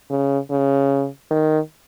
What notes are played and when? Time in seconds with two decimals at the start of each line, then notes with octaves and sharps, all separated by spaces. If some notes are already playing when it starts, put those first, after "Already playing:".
0.10 C#3
0.51 C#3
1.31 D#3